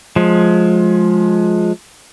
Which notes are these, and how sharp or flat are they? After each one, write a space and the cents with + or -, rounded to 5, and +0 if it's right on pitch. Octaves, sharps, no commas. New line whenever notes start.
F3 +20 G#3 +20